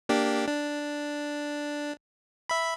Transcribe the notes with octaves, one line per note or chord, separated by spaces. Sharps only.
A#3 D4 G4
D4
E5 B5